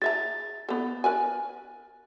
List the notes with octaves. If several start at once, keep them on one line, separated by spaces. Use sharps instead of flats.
G#4 E5 A#5 A6
B3 A4
A#4 B4 G#5